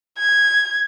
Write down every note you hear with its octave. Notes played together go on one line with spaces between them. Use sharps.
G#6